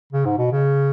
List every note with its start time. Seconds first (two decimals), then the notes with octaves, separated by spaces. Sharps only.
0.13 C#3
0.25 G#2
0.38 B2
0.52 C#3